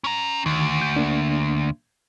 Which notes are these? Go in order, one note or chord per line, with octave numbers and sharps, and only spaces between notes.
C#4 A#5
D2 D#3
G6
A#3 D4